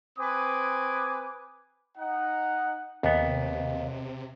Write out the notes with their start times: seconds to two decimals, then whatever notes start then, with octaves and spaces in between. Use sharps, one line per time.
0.18 C4 B4 G#5 D6 D#6
1.98 D#4 F#5
3.03 D#2 C3 B3